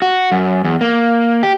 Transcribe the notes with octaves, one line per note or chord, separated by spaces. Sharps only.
F#4
F#2
E2
A#3
G4